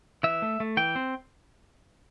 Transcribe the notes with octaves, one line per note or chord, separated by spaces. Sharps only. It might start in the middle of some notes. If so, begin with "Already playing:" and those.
E3 E5
A3
A3
E3 G5
C4